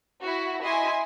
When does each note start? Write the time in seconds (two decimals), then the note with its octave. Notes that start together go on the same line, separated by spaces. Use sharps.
0.21 E4 F#4
0.62 E4 D#5 G#5 C6